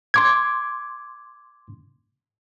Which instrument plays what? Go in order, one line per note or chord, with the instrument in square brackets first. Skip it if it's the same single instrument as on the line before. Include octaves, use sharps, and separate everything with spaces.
[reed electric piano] C6 D6 G#6